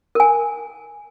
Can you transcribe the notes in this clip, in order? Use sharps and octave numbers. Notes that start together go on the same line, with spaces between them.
A#4 G#5